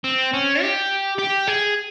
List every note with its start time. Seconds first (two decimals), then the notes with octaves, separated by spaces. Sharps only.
0.04 C4
0.34 C#4
0.62 G4
1.18 G4
1.47 G#4